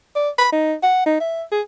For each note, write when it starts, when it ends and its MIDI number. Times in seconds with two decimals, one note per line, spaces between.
0.16 0.29 74
0.38 0.48 83
0.52 0.74 63
0.83 1.03 78
1.06 1.17 63
1.20 1.43 76
1.52 1.61 68